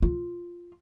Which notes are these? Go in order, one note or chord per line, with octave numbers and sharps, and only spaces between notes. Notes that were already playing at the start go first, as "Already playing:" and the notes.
F4